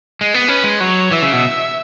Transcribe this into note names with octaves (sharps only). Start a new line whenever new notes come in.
G#3
B3
C#4 B4
G#3
F#3 C#5
E3 E5
C#3
B2